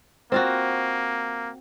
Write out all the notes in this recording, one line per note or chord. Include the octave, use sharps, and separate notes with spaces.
A#3 C4 F4 F#4